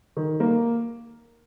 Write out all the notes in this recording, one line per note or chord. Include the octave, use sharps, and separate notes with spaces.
D#3
A#3